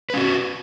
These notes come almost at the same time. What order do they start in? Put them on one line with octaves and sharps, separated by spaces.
B4 C#4 F#4